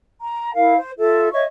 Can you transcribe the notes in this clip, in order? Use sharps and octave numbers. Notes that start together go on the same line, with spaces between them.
A#5
E4 A#4 F5
C5
F4 A4 E5
C#5 D#5 E5 C#6